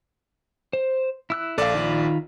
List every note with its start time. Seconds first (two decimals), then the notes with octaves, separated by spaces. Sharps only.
0.73 C5
1.30 E4 E6 F#6
1.58 A#1 A4 D5 F5
1.75 D#3 F4 B5